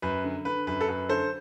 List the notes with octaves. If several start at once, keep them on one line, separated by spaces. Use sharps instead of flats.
F#2 B4
D3
D3 B4
F#2 B4
A4
F#2 B4
D3 A4 C5